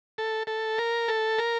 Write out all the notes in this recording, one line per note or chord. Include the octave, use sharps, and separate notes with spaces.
A4
A4
A#4
A4
A#4